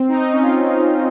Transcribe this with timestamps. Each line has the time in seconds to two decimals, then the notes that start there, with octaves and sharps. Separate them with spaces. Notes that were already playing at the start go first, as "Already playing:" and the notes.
Already playing: C4
0.08 D#4
0.19 D#4
0.31 C#4
0.42 F4